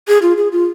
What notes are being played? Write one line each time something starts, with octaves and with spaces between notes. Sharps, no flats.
G#4
F4
G#4
F4